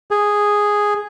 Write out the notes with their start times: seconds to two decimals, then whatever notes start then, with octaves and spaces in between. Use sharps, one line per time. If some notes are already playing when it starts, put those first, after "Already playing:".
0.11 G#4